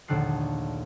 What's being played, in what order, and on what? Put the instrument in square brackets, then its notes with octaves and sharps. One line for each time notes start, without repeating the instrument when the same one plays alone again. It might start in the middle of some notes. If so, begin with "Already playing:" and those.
[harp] A#1 D#2 D3 A3 F#6 C7